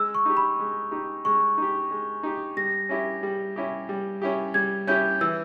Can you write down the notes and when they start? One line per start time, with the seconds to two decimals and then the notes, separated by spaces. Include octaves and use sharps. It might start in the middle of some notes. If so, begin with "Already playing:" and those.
Already playing: G#3 E6
0.15 C#6
0.26 D#4 G4
0.37 B5
0.59 G#3
0.91 D#4 G4
1.25 G#3 C#6
1.58 D#4 G4
1.91 G#3
2.23 D#4 G4
2.57 G3 A#6
2.89 C#4 E4 G4
3.23 G3
3.56 C#4 E4 G4
3.89 G3
4.22 C#4 E4 G4
4.54 G3 G#6
4.87 C#4 E4 G4 G6
5.21 E3 E6